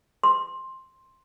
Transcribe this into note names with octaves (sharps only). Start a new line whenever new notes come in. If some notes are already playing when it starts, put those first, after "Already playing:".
C6